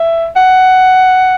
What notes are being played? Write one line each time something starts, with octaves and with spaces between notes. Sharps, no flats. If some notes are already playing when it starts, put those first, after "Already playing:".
Already playing: E5
F#5